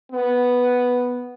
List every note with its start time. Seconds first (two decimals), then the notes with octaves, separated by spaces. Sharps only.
0.12 B3